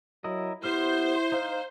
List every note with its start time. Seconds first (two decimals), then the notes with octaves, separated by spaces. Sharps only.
0.24 F#3 E4 A#4 D#5
0.64 B3 E4 G4 C5 F6
1.32 D#4 F5